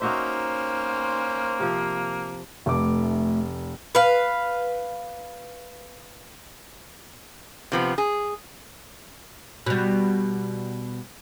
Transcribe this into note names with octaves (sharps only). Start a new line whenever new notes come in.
A#3 C#4 D#4 F#4 C5 E5
C3 F3
F1 A3 D6
B4 F5
C3 F3 B3
G#4
B2 G3